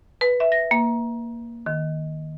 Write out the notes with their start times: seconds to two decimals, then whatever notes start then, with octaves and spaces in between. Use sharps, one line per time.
0.21 B4
0.40 E5
0.52 A#6
0.71 A#3
1.66 D#3